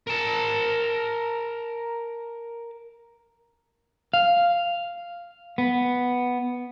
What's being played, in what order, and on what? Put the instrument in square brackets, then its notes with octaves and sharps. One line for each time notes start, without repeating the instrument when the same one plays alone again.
[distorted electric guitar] A#4 A5
[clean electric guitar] F5
B3